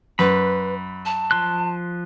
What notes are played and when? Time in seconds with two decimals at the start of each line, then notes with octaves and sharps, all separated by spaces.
0.19 F#2 B4 B5
1.05 A5
1.31 F3 C6 F#6